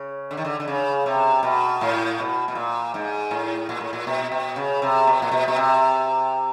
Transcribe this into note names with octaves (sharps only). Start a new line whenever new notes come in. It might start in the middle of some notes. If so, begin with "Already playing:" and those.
Already playing: C#3
D3
D#3
D3
D3
C#3
C3
B2
A2
B2
B2
A#2
G#2
A2
A#2
A2
A#2
B2
B2
C#3
C3
B2
A#2
B2
B2
C3